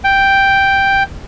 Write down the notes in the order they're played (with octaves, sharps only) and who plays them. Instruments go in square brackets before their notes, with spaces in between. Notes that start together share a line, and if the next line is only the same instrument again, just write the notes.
[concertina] G5